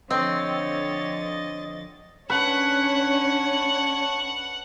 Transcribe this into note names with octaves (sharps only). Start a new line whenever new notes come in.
D3 F3 C4 C#5 D#5 A6
C#4 D4 B4 C#5 F#5 A5 C#6